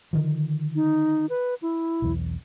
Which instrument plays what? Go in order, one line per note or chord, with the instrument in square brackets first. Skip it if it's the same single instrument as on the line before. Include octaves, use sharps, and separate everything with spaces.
[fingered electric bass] D3 D#3 F3
[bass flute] D#4
B4
E4
[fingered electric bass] B1 E2